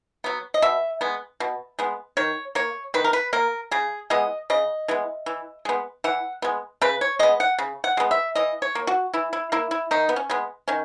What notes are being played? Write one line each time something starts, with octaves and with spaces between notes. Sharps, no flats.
F#3 B3
D#5
B2 E5
G#3 B3
B2
G#3 B3
D#3 C#5
A#3 C#5
D#3 B4
A#4
B4
A#3 A#4
C#3 G#4
E3 G#3 B3 D#5
C#3 D#5
E3 G#3 B3
E3
G#3 B3
E3 F#5
G#3 B3
C#3 B4
C#5
G#3 B3 D#5
F#5
C#3
F#5
G#3 B3
E5
E3 D#5
C#5
A#3
F#4
E3 E4
E4
A#3 E4
E4
D#3 D#4
B3
C#4
G#3 B3
D#3 C#4